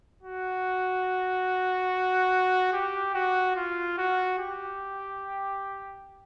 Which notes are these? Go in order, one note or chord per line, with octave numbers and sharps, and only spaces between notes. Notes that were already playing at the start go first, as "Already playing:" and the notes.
F#4
G4
F#4
F4
F#4
G4